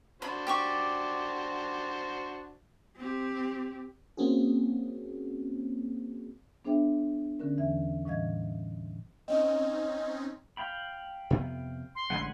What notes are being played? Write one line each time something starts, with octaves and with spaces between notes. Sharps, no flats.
D4 F#4 C5 B5
G4 D5 C#6
C4 G4
A#3 C4 C#4 F#4 G#4
B3 D4 G#4 C5 E5 G5
D3 C#4 A#4
E2 E3 E5
A2 E3 G3 D#5 F5 G#6
C4 C#4 D#4 D#5
F5 G5 B5
F2 C3 B3
C6
A1 D3 G#3 F#5 G#5 B5